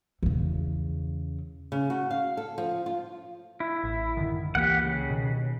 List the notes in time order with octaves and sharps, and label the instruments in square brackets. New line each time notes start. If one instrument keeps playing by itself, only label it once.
[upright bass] E2 C#3
[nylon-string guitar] C#3
F#4
F5
A4
F3
F4
[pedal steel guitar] E4
[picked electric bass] A1
F#2 D3 D#3
[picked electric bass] C#2 E3 A#3 [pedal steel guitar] G4 F#5
[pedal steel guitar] C#3
[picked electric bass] B2 D#3